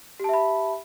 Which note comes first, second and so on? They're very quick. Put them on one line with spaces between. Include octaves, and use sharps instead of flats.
G4 A5 E5 B5